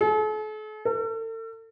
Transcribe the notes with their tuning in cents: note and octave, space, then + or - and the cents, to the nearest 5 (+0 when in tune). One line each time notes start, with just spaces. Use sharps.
A4 -45
A4 +40